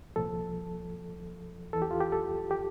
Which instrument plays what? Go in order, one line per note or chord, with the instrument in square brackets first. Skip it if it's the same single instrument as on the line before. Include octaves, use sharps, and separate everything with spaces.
[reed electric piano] C2 A#2 F3 A4
E2 E3 A4
G4
F4
G4
A4
G4